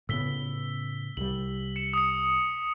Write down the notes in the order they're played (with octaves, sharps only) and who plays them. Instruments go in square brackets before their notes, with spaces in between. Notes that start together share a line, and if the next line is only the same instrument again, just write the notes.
[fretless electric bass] A2 C#3 B3 [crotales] E6 B6 G7
[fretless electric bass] C2 G3 [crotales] F#7
[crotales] C#7 E7
D#6 C#7